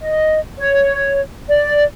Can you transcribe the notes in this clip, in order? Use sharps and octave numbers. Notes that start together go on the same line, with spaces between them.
D#5
C#5
D5